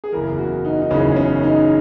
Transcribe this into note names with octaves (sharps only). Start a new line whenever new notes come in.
G#4
F#1 E2 C#3 E3 A#4
F#4
D#4
D#4
F#1 E2 C#3 E3 C#4
C#4
D#4